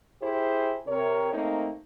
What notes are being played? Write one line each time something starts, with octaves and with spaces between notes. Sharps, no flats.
E4 G4 G#4 C5
C3 A#4 C#5
A3 A#3 C4 D#4